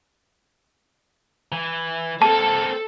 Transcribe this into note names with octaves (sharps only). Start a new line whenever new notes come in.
E3
A#3 C4 A4 A5